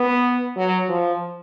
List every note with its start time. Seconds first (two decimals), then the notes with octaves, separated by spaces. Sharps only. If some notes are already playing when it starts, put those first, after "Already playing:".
Already playing: B3
0.57 F#3
0.89 F3